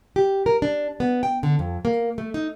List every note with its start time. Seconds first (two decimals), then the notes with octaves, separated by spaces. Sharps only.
0.16 G4
0.46 A#4
0.62 D4
1.00 B3
1.23 G5
1.43 D3
1.59 F2
1.85 A#3
2.18 A3
2.34 D#4